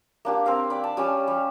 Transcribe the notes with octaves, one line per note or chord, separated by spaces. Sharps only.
A#3 D4 G4
C4 A#4 F5
D5 B5
A5
G3 C#4 G#5 A5
G3